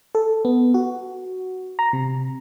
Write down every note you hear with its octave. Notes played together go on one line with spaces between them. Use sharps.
A4
B3
F#4
A#5
C3